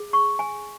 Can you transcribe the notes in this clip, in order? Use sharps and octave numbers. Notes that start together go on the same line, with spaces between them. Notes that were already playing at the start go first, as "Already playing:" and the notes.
Already playing: G#4
C#6
G#5